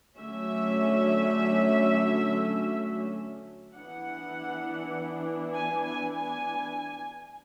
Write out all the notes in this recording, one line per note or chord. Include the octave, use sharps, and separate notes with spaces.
D3 F#3 A3 C#4 E5
E3 B3 D4 F#5
G#5
G#5
G#5